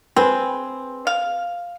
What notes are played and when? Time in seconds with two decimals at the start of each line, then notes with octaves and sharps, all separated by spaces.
0.16 C4 G#4 B4
1.07 F5